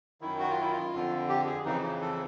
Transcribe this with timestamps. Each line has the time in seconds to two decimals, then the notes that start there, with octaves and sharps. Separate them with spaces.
0.21 F#2 D#3 E4
0.39 F#4
0.51 F4
0.61 E4
0.72 F4
0.94 F2 D3
1.29 G4
1.46 G#4
1.65 F2 C#3 E3 D#4
1.83 D#4
2.01 A4